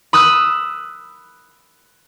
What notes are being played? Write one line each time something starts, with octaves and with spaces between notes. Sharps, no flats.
B5 D#6 E6 F#6